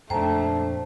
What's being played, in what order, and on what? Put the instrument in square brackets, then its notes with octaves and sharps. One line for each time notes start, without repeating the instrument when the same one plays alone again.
[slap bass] F2 A#2 [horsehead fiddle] A3 D4 [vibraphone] C5 [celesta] G5 A5 A#5